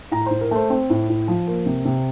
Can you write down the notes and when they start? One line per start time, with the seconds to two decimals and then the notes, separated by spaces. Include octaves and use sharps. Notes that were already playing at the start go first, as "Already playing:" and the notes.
0.11 A2 A#5
0.26 A2 C5
0.41 A#4
0.51 A3 C5
0.70 C4 C5
0.90 A2
1.09 A2
1.28 F3
1.47 A#3
1.66 C3
1.85 C3